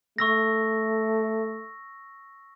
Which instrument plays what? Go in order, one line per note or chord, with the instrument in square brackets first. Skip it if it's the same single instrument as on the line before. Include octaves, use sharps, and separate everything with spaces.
[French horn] A3 [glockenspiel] C#6 E6 A#6